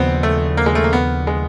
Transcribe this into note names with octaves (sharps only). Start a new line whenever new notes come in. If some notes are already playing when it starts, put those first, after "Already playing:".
Already playing: D#2 C#3 F3 B3 C4
A3
A#3
G#3
A3
A#3
B3
G#3